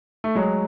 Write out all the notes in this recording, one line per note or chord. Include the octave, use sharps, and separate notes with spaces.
A3
F#3 G#3